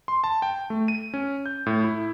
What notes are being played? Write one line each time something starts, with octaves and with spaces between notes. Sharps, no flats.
C6
A5
G5
A3
D#7
C#4
G6
A2
E4